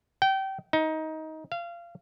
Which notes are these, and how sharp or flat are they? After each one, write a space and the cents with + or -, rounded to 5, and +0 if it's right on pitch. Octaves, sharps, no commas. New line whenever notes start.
G5 -25
D#4 +20
F5 -25